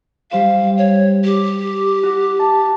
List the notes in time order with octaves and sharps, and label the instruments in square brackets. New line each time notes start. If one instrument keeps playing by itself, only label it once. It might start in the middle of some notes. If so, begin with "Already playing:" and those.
[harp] G3 C5 E7 [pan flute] F5
[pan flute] C#5
G4
[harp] F#4
A5